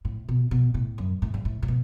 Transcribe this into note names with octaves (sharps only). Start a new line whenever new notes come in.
A2
B2
B2
A2
F#2
A2
G2
A2
A2
B2